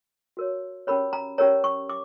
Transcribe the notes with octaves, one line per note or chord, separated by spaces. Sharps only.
F#4 A#4 C#5
C#4 G4 A#4 C#5 B5
A#5
C#4 G4 A#4 C#5 A#5
C#6
D6